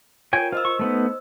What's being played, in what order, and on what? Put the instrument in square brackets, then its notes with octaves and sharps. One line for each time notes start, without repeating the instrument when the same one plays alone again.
[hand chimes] F4 A#4 [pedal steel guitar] C#5 G5 G#5
[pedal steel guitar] F4 [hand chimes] C5 D#5 E6
[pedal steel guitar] C#6
A3 B3 D#4